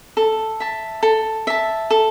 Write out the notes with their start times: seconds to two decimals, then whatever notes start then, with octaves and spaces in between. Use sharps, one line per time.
0.17 A4
0.60 E5 A5
1.03 A4
1.47 E5 A5
1.90 A4